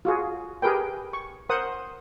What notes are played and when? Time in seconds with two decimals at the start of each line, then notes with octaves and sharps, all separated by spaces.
0.05 F4 F#4 G#4
0.62 G4 G#4 A#4 B4 G5
1.13 C#6
1.49 A#4 C5 F#5 D#6